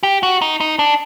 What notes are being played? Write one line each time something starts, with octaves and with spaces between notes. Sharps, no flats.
G4
F#4
D#4
D#4
D4